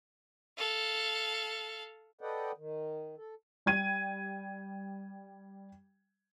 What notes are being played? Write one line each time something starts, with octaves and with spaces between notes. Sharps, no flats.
A4 F5
A4 B4 D5 D#5 F#5 G5
D#3
A4
G3 G5 G#6 D#7